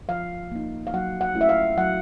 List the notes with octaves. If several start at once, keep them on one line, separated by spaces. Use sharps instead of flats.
F3 F5
A#3 D#4
F5
F#3 F#5
F#5
A3 C#4 E4
E5
F5
F#3 F#5